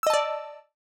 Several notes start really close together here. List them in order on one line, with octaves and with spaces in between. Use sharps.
E6 D#5 A5 D5